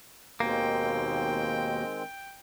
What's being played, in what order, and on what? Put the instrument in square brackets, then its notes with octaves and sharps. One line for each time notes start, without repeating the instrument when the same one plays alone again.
[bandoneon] D#2 B2 [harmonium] D#3 G#3 C4 [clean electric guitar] A#3 [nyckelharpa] G5